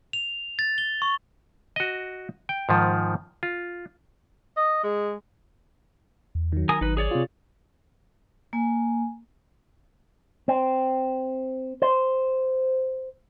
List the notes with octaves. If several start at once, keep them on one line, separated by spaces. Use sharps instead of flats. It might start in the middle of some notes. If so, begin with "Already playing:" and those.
F7
A6
G7
C#6
F#4 D#5
G5
G#2 D#3 F3
F4
D#5
G#3
E2
D#3 F#3
A#4 G#5 D#6
G#1 D#4 B4
G#4 C#5 D5
C3 F4
A#3 G#5
C4
C5